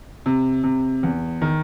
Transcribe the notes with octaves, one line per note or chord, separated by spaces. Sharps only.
C3
C3
E2
D#3